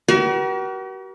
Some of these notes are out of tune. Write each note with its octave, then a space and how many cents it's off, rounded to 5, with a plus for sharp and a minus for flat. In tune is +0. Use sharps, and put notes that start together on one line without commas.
F#4 +45 A#4 +45